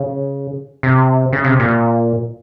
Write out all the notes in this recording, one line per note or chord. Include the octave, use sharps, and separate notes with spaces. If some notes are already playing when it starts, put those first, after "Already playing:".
Already playing: C#3
C3
C#3
C3
A#2